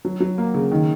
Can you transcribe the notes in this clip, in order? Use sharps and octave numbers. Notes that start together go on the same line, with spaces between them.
F#3
F#3
A#3
C#3
D#3